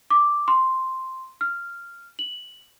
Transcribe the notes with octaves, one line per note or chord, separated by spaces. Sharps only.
D6
C6
F6
F#7